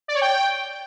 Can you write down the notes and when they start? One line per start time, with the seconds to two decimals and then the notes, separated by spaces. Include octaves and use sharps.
0.08 D5
0.15 C#5
0.22 G5